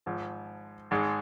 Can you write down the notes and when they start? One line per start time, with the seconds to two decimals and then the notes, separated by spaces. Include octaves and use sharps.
0.06 G#1 G#2 F3
0.91 G#1 G#2 G#3